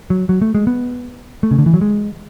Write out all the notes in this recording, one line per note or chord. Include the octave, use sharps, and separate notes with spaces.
F#3
F#3
A3
G#3
B3
A3
C#3
D3
E3
F#3
G#3